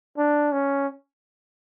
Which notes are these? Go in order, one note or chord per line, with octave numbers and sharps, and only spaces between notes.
D4
C#4